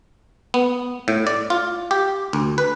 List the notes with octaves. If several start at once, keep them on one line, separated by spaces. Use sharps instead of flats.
B3
A2
D5
F4
G4
D2
B4